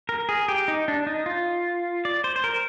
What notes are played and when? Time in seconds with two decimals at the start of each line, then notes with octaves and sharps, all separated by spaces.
0.09 A#4
0.29 G#4
0.48 G4
0.68 D#4
0.88 D4
1.07 D#4
1.26 F4
2.05 D5
2.24 C5
2.36 C5
2.44 A#4